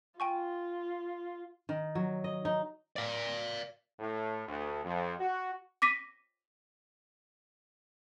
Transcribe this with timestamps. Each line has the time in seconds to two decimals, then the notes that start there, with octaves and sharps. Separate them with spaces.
0.20 F4 G5 G#5 C#6
1.69 D#3
1.95 F#3
2.24 D#5
2.45 D#4
2.96 D5 F5
3.99 A2
4.46 D2
4.83 F2
5.19 F#4
5.82 D6 A#6 B6 D#7